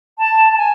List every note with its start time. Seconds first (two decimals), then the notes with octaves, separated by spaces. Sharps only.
0.18 A5
0.52 A5
0.57 G#5